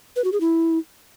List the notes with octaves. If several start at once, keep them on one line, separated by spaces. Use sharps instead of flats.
B4
F#4
G#4
E4